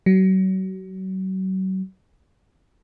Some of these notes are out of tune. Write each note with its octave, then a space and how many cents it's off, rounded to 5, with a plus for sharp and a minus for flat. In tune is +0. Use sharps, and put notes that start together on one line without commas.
F#3 +35